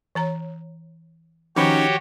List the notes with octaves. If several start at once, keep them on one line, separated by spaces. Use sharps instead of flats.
E3 C#5 A#5
D#3 F3 C#4 D#4 F#4 G4 C#5